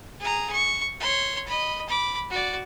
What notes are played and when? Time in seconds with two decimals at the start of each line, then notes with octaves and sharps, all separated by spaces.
0.20 G#4 A#5
0.52 C#6
1.00 C#5 C6
1.47 D#5 B5
1.88 B5 D6
2.30 F#4 D5